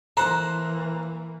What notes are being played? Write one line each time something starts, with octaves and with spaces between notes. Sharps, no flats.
E3 A#3 A4 C5 F#5 A#5